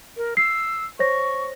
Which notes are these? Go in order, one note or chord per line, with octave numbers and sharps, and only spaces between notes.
A#4
E6 C7
C5 C#5 C#6 A#6